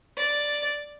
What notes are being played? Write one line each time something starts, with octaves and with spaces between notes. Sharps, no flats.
D5